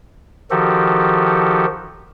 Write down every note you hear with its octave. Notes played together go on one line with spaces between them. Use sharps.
D#3 F3 F#4 G4 A4